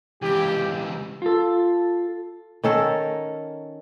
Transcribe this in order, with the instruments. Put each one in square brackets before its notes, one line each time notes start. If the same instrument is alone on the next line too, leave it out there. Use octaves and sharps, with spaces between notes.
[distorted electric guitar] C#2 E3 [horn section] G4
[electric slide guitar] F4 A4
[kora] D#3 C#4 A4 A#4